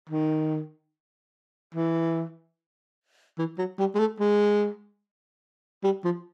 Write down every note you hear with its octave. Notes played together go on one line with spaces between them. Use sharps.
D#3
E3
E3
F#3
G3
G#3
A3
G#3
G3
F3